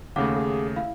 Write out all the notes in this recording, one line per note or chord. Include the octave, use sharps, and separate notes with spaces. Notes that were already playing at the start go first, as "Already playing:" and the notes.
D#2 C#3 A3 F5 F#5 D6
G#4
E4 F5